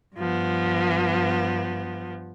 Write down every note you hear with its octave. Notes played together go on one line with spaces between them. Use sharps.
G2 F3 B3